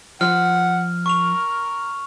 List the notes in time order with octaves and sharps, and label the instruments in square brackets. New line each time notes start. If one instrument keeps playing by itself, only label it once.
[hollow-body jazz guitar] F3 [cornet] F#5 [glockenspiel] F6
[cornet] A#4 [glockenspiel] C#6 F7